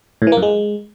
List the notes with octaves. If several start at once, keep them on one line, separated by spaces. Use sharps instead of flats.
A2
E3
A#3
F#2
G#3